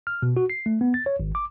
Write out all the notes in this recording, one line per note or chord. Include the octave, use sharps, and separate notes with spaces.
F6
B2
F#4
C7
A3
B3
A6
C#5
G#1
D6